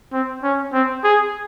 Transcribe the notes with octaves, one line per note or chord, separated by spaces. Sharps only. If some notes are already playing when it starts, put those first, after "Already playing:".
C4
C#4
C4
G#4